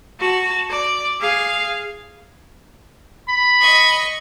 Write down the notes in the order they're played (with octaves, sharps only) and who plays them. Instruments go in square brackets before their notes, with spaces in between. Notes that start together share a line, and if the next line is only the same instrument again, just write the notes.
[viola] F#4 A5
D5
G#4 F5
[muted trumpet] B5
[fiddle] D#5 C#6